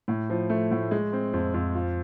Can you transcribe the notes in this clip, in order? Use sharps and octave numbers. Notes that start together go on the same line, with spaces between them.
A2
F3
A3
A2
G#3
C4
F2
F2
F4